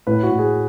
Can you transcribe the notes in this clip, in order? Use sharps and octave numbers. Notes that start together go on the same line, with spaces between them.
A2 B4
F#4
A2
G#4